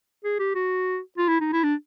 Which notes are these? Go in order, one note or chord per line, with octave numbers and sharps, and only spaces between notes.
G#4
G4
F#4
F4
E4
D#4
E4
D4